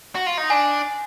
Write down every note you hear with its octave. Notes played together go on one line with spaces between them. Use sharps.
F#4
F4
D#4
D4 G#5